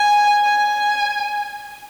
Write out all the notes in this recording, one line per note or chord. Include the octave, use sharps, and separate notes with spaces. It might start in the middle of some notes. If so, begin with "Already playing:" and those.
Already playing: G#5
G#5